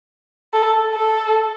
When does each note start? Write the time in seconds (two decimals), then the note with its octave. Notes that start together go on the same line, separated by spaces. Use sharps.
0.53 A4
0.94 A4